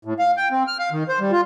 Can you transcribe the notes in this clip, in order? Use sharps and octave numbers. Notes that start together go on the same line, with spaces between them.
A2
F5
G5
C4
F6
F5
D#3
C5
G3
F4